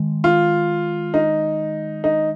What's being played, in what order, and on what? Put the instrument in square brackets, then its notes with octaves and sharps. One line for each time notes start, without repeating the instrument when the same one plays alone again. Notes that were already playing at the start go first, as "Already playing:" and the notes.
Already playing: [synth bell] D#3 G#3
[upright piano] F4
D#4
D#4